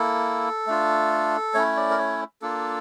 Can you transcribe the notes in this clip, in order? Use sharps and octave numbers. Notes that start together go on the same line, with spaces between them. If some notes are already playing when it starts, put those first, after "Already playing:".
Already playing: A#3 E4 A4
A3 D4 F4
A3 C#4 E4 C#5
D5
A#4
C#5
A#3 D4 F4 A4